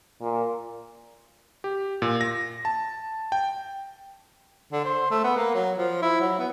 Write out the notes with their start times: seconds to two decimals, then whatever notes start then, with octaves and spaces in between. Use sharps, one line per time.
0.21 A#2
1.64 G4
2.02 A#2
2.21 A#6
2.65 A5
3.32 G5
4.72 D3
4.85 C5
5.11 A3
5.24 B3
5.37 A#3
5.55 F#3
5.78 F3
6.02 E4
6.21 F#3
6.39 B3